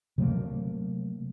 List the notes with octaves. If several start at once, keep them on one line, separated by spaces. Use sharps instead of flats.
C3 F#3 A3 A#3